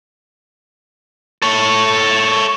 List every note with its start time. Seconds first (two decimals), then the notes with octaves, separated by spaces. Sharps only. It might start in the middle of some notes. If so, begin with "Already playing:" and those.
1.42 A4 C#5